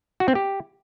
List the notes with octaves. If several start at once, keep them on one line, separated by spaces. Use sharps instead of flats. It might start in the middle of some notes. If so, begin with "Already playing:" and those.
F#4
C4
G4